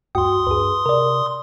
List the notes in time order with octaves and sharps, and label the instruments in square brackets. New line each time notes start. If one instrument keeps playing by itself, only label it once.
[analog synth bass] D2 [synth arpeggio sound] G2 F#4 G5 [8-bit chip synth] C6 D#6
[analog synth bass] G2 [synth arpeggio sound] G#4 B4
[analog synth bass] C3 [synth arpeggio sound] A#4 D5